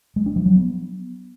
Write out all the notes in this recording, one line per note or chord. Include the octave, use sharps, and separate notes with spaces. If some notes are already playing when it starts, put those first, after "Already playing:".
G#3
D4
F3
F#3
B3